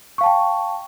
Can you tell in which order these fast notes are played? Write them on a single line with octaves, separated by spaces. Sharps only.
C#6 F5 A5 G5